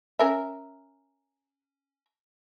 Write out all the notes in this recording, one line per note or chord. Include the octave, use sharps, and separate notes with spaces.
C#4 A#4 E5